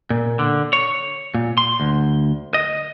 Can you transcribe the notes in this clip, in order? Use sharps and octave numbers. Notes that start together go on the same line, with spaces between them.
A#2
D3
C#5
A#2
C6
D2
D#5